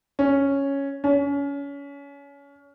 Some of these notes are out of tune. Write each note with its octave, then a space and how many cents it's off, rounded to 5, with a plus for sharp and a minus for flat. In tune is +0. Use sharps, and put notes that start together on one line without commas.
C#4 +0
C#4 +30